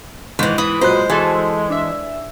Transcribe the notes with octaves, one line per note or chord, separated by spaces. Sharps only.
G#2 D#3 E3
E3 B5 D#6
A#2 F#3 G#3 C5 F#6
E3 F#4 G#4 A4 C5
D4 E5